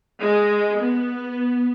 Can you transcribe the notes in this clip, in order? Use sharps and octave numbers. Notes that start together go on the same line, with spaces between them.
G#3
B3